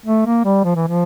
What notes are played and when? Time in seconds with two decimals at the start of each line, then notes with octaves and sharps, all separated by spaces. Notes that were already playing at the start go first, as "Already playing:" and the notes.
0.06 A3
0.26 A#3
0.45 G3
0.64 F3
0.75 E3
0.88 F3